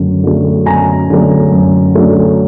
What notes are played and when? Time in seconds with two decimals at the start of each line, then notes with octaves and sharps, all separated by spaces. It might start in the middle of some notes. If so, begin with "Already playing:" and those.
Already playing: F#2 D3 F#3 A3
0.24 D3 F#3 A3
0.66 F#2 G#5 A#5
1.10 D3 F#3 A3
1.52 F#2
1.95 D3 F#3 A3